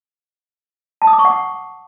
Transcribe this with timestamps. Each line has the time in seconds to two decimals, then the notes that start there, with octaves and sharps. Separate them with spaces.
1.02 A5
1.07 D#6
1.13 D6
1.19 C#6
1.25 F#5